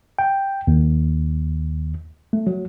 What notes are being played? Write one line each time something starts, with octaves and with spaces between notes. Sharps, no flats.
G5
D#2
A3
F#3